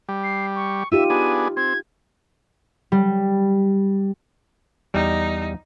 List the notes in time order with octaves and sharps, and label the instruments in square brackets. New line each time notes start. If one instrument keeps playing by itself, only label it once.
[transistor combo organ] G3
[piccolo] C7
C#6
[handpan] D#4 F4 G4 [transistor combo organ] E5 [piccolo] D#7
[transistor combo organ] B3 D4 G#4
[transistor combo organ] C4 [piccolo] G#6
[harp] G3
[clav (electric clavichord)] E2 G3 [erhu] D#4